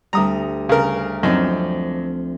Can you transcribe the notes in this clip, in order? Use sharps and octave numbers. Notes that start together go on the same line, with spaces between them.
D2 G3 A#5 D#6
C#3 A#4
F#2 F3 C4 D4 D#4